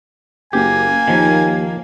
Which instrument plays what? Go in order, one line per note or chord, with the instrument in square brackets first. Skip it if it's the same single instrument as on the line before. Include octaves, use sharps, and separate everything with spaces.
[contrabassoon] F#1 [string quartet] A#3 [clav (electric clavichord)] G4 [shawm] G#5
[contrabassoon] D#2 [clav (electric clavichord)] D#3 F3